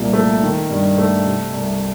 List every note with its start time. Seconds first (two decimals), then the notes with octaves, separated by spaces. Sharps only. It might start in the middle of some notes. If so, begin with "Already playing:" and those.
Already playing: C2 A#2
0.13 A3
0.42 D#3
0.70 G2
0.98 A3
1.25 C3
1.54 C2